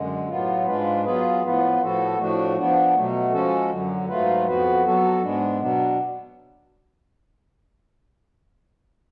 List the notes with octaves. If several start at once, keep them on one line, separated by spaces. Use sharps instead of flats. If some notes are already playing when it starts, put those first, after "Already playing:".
Already playing: F#2 D3 G#3
A2 F#3 B3 F4
G#2 G#3 D4 F4 B4
F#3 B3 F4 G#4 B4
A2 F3 B3 F4 B4
A2 F3 B3 F#4 A4
A2 F3 A3 D4 F#4
F3 B3 D4
B2 F#3 A3
F3 G#3 C#4 F#4 A4
F#2 D3 F#3
G#2 F#3 A3 F4 B4
F2 F3 B3 F#4 B4
F#3 B3 F#4 A4
G#2 G#3 B3 D4
B2 F#3 B3 D4